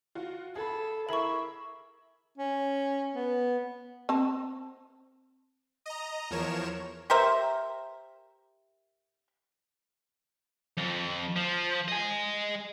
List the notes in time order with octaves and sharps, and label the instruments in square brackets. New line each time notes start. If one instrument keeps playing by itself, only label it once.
[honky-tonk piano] F4 F#4
[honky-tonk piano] G#4 B5 [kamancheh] A4
[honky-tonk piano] E4 G#4 A#4 [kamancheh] E5 [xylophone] B5 C#6
[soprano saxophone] C#4
B3
[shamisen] C4 A5
[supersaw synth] D#5 A#5
E2 F3 A#4 C#5 E7
[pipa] G4 A#4 C5 E5
[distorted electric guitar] F2
F3
D#5 G#5